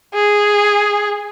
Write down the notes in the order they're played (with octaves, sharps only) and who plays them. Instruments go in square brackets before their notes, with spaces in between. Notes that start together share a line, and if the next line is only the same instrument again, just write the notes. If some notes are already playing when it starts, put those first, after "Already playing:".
[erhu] G#4